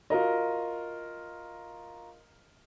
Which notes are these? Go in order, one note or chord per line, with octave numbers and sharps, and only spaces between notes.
F4 F#4 A#4 D#5